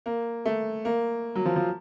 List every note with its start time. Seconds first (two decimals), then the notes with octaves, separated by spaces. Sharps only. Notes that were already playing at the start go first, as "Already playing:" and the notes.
0.06 A#3
0.45 A3
0.85 A#3
1.35 F#3
1.45 F3
1.56 F3